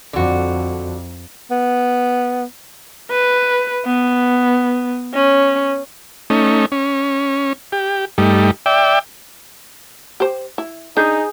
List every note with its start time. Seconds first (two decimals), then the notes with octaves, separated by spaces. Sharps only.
0.13 F2 D3 F#4
1.51 B3
3.11 B4
3.86 B3
5.14 C#4
6.30 A3 C#4 D#4
6.72 C#4
7.72 G4
8.18 G2 G3 A3 D#4
8.66 D5 E5 G5
10.20 G4 C5
10.58 E4
10.97 D4 D#4 G#4 G6